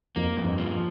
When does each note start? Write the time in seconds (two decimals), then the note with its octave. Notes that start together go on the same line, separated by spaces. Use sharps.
0.16 F2 A#3
0.37 G2
0.44 F2
0.58 F3